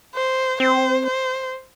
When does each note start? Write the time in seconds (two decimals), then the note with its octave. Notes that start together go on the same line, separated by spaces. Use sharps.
0.15 C5
0.60 C4 C5
1.06 C5